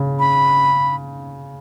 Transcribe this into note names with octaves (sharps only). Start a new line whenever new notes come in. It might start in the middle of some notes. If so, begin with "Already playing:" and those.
Already playing: C#3
B5